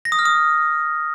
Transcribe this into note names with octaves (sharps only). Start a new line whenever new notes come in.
A#6
D#6
F6
D#6